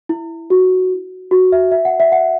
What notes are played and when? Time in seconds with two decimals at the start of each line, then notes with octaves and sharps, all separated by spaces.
0.09 E4
0.50 F#4
1.31 F#4
1.52 E5
1.72 E5
1.85 F#5
2.00 E5
2.12 F#5